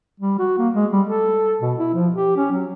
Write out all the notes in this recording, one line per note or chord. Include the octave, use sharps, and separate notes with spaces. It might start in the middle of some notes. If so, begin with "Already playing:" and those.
G3
F#4
A#3
G#3
G3
A4
B2
E4
F3
G4
C#4
F#3